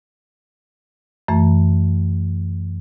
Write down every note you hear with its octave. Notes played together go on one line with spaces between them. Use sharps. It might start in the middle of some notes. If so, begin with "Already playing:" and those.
F#2 E3 A3